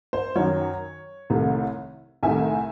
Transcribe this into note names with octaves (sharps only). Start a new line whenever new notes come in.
C5
F#2 D#3 F#3 C#5
C2 C3 D#3 A3
C2 C3 D#3 A3 E5 G#5